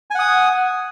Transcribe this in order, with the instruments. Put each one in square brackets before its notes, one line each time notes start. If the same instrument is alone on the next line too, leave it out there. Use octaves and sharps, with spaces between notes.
[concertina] G#5
F#5
D#6